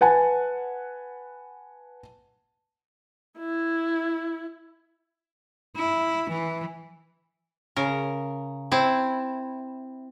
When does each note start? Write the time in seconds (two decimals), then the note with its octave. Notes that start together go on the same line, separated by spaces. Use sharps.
0.01 B4 F#5 G#5 A5
3.39 E4
5.76 E4
6.30 E3
7.76 C#3 A#4
8.71 C4 E4